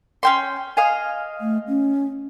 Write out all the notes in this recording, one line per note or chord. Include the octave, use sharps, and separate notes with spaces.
C#4 G5 C6
D#5 F5 G#5
A3
C#4